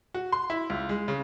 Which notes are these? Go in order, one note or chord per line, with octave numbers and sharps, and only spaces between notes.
F#4
C6
E4
C#2
G#3
C#3